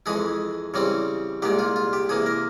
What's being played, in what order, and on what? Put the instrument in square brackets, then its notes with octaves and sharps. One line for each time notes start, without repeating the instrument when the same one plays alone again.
[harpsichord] F2 E3 G#3 E4 G#4
C#3 E3 G3 C4
C2 A#2 G#3 G4
F4
F4
G4
C3 E3 A#3 G#4
A#4